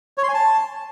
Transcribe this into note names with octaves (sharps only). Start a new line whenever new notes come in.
C#5
C6
G#5
A5